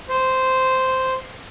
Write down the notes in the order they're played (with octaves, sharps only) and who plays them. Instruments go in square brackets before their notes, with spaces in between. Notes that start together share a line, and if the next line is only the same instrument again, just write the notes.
[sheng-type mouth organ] C5